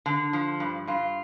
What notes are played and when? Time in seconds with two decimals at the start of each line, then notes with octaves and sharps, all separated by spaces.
0.06 D3
0.33 F3
0.60 G2
0.87 G2 F4